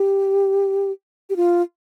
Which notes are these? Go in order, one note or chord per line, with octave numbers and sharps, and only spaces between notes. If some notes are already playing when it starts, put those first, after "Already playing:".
Already playing: G4
G4
F4